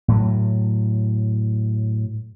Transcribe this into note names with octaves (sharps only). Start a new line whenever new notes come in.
A2 F#3